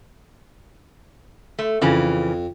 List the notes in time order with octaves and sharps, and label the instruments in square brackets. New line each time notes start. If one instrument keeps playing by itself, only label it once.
[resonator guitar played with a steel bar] A3
[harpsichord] F2 [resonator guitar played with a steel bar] C#3 E3